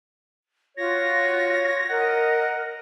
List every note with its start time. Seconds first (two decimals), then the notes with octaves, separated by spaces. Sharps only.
0.77 F4 F#4 C#5 A#6
1.90 A#4 D#5 F#5